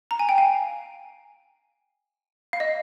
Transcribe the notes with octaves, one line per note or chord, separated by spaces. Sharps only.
A#5
G#5
G5
F5 G#5
F5
D#5